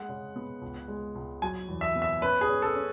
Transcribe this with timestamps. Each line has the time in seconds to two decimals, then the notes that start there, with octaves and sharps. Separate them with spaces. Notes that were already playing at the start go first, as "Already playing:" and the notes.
Already playing: G#3 F#5
0.09 C#3
0.36 B3
0.61 C#2
0.88 G#3
1.15 C#2
1.42 F#3 G#5
1.69 E2
1.81 E5
1.95 B3
2.02 E5
2.21 C#4 B4
2.41 G#4
2.49 C#4
2.62 A4
2.75 C#4